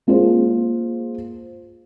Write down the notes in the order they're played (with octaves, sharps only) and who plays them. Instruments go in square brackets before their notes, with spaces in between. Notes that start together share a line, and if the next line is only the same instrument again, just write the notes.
[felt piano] G#3 A#3 F4 G#4 C5